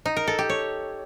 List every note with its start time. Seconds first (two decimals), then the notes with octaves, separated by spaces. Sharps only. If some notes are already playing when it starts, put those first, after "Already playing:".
0.05 D#4
0.17 A#4
0.28 A4
0.39 G4
0.50 C#5